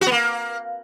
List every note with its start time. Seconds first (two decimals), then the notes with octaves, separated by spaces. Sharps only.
0.01 F#4
0.07 B3
0.12 A#3